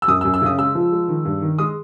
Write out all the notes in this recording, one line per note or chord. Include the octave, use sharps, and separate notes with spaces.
E6
F#2 D#6
E6
F#2
E6
C#3 D#6
G#3 E6
F3
G#3
D#3
G2
D#3
G#3 D#6